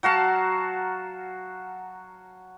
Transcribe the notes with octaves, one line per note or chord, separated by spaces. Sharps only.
F#3 F#4 F5 A5